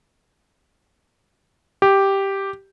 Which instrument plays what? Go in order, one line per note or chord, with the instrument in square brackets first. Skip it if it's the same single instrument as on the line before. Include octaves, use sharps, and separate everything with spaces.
[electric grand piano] G4